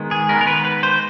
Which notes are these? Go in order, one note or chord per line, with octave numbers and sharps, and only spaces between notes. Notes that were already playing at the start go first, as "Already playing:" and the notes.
Already playing: D#3 G#3 B3
G#4
D#3 G#3 B3 A#4
A#4
B4
B4
C5